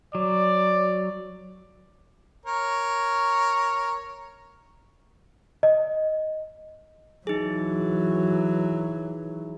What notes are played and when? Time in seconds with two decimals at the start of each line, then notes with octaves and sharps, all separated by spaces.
0.15 F#3 D5
2.46 A#4 C#5
5.63 D#5
7.27 E3 F#3 D#4 G#4